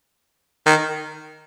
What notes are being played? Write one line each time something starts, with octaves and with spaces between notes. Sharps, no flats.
D#3